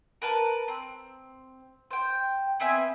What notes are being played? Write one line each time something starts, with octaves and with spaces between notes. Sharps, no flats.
A#4 B4 A5
C4
C5 G5
B3 C4 E5 G#5